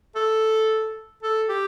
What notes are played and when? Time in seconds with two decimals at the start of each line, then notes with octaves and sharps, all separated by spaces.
0.16 A4
1.23 A4
1.49 G4